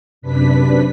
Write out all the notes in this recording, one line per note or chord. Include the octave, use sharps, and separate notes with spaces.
F#2 C3 D4 B4 B6